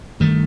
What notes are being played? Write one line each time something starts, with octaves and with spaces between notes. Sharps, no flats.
G2 D#3 A3